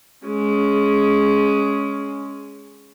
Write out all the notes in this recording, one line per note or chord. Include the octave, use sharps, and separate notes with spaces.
G#3 C#4